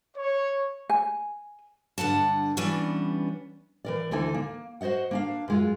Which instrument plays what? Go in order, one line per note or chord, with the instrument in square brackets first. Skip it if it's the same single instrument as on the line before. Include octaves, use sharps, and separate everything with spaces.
[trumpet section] C#5
[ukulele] G#5
[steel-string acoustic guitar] G2 D3 F#5 A5
E3 G3 B3 C#4 D4
E3 A#4 D5
D2 D3 E3 D#4 A4 G#5
A#3
F#4 C5 C#5 D#5 F#5
A#3 D4 F5
F#2 G#3 F4